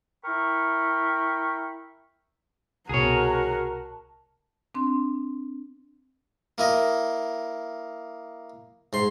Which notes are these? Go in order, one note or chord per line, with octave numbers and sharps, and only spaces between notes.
E4 A#4 G5 B5 C#6
C2 B2 F#4 G#4 A#4 C#5 A5
C4 D4 C6
A#3 E4 D#5
G#2 C6